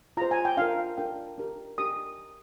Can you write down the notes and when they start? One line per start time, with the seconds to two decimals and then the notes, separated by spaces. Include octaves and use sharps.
0.17 F4 G#4 C5 A#5
0.31 G#5
0.45 G5
0.57 D4 F4 A#4 F5
0.98 D4 F4 A#4 G5
1.38 D4 G4 A#4
1.78 D4 G4 A#4 D#6